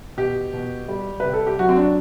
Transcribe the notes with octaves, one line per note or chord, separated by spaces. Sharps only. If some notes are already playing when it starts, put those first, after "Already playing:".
B2 G4
B2
G3
C3 B4
A4
G4
F#3 F#4
C4
D4